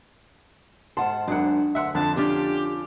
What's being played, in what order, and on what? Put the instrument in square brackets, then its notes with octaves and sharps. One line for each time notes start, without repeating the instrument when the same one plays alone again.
[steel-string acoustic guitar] G#2 F#5 A5 [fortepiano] C6
[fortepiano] G#1 F#2 F#5 [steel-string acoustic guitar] D4
[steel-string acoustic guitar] D2 [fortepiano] E5 F#5 C6
[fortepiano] F2 D3 [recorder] A5
[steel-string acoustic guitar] C#4 D4 F4 [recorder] G4